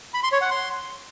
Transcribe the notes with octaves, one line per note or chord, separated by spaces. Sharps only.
B5
C6
C#5
F#5
C6